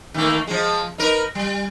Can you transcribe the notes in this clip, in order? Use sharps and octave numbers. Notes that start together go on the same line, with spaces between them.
D#3 A3 A#3
F3 G#3
D#4 A#4 B4
G3